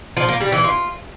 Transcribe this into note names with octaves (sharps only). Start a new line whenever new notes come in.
F3
A#3
G3
E3
F4